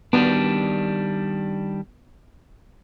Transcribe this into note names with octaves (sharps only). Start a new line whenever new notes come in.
D#3 G3 B3 D4